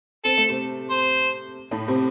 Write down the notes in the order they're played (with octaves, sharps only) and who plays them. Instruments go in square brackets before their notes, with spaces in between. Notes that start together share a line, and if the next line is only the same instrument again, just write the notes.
[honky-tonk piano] C4 [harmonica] A4
[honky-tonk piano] A3
C3 C4
[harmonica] C5
[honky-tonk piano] A2 A3
C3 C4